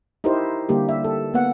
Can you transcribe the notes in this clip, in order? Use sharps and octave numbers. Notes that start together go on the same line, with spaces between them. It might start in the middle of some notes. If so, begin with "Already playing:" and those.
D#4 E4 G4 A#4 C5
D3 G3 A#3 G4
E5
A4
A#3 B3 F#5